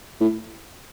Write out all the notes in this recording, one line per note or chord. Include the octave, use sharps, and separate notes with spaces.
A2